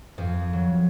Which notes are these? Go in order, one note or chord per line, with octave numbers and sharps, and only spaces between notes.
F2
F#3